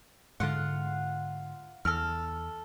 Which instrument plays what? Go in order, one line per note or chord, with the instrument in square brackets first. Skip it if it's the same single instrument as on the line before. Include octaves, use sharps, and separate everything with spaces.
[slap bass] G#2 D3 [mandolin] F4 F5 F#5
[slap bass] E2 [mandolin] A4 F6